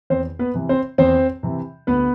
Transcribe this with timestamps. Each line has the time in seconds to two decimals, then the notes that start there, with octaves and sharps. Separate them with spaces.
0.10 E2 C4 C5
0.39 B3 B4
0.54 C3 E3
0.69 C4 C5
0.98 E2 C4 C5
1.43 C3 E3
1.87 D2 B3 B4